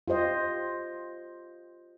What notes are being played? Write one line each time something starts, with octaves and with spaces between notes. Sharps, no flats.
F4 G4 C5 D#5